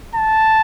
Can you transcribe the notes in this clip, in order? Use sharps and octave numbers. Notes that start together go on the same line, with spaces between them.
A5